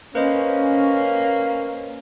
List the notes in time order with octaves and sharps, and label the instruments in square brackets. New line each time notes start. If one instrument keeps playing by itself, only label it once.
[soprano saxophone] A#3 [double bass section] C#4 [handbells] B4 C5 D#5